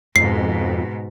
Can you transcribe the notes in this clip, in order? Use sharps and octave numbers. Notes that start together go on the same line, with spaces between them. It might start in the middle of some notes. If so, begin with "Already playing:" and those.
F2 G#2 B2 C7